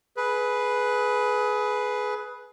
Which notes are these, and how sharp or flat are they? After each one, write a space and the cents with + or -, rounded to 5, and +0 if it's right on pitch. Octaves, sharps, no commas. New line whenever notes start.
G#4 +20 B4 +0